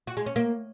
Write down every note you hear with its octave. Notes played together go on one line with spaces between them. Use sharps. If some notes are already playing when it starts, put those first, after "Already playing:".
F#4
G#3
C#4
A#3